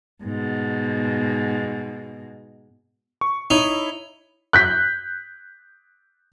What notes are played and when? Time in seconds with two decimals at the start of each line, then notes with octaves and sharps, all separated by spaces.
0.24 G#2 B2
3.21 C#6
3.50 D#4 E4 C#5
4.53 F#6 G6 B6